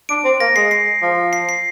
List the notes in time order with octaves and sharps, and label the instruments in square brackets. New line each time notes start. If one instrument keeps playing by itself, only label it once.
[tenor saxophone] D4 [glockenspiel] D7
[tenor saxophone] C4
[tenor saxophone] A#3 [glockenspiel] A#6
[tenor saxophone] G#3 [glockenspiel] C7
[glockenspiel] C7
[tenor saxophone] F3
[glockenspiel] C7
C7